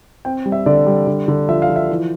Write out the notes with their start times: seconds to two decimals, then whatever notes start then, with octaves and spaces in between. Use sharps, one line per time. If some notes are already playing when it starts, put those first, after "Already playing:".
0.25 C4 G5
0.46 G3
0.52 E5
0.66 D3 D5
0.87 G3
1.07 D3
1.28 D3
1.49 F3 E5
1.62 F5
1.69 F3
1.76 E5
1.90 E3